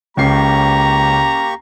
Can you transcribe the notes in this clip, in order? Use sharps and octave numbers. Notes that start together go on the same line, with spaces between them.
C#2 A#3 C#4 G4 A#5 C#6 C7